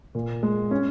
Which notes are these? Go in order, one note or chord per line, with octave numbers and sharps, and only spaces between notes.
A#2
G#3
C#4